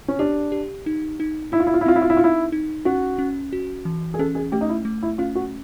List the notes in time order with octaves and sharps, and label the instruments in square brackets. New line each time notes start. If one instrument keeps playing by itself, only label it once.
[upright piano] C#4
[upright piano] D4 [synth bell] G4
[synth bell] G4
D#4
D#4
[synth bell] D#4 [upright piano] E4
[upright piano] F4
E4
F4
E4
[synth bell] C4 [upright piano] F4
[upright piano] E4
F4
E4
[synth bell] D#4 [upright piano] F4
[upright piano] E4
[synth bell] D#4
[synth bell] C#4 [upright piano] F#4
[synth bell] C#4
F#4
E3
[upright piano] G#4
[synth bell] C#4 [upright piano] A4
[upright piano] G#4
[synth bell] A3 [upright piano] G4
[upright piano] D#4
E4
[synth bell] A3
[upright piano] E4
[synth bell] C#4 [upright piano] F4
[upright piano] F#4